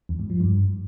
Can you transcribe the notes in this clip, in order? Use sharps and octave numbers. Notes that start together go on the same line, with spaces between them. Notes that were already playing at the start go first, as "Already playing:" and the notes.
E2
G#2
F3
G2